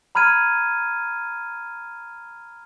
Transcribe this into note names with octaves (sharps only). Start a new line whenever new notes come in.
A#5 B5 F6 G#6 D#7